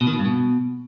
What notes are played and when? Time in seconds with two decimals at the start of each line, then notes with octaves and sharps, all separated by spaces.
0.01 B2
0.07 D#3
0.13 B2
0.19 G2
0.25 B2